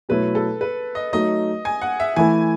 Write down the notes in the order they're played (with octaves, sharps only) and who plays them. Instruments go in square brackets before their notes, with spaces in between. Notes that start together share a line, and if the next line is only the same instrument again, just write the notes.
[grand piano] B2 F#3 A3 E4 [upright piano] B4
[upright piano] A4
B4
D#5
[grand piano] F#3 A3 D#4 F#4 [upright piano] D#5
[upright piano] G#5
F#5
E5
[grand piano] E3 A3 E4 [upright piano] G#5